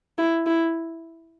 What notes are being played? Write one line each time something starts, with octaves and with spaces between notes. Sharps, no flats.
E4
E4